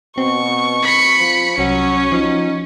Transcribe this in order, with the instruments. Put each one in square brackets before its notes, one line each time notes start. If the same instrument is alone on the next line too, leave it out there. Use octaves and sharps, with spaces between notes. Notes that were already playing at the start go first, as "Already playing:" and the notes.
[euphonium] B2 [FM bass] C4 [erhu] C#6
[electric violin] B5 C#7
[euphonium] F3
[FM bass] C2 [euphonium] F#3 [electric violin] C#4 [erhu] C#5
[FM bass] F3 [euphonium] D#4